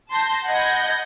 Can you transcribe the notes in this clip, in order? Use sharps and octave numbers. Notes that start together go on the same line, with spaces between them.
A5 C6 G6 A#6
D#5 F#5 B5 G6 G#6 A#6